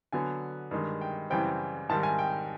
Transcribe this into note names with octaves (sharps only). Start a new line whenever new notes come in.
D3 F#3 B3 G#5
G2 D#3 G#3
G5
F#2 C#3 E3 G3 C4 G5
G#2 D#3 G3 A5
G#5
G5